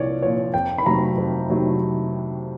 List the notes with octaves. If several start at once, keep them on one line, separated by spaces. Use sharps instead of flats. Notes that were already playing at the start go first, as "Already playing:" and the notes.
Already playing: C2 A#2 F3 C#5 D5
A#2 F3 C#5
F2 G5
B5
C3 D#3 F#3 A3 A#5
F2
C3 D#3 F#3 A3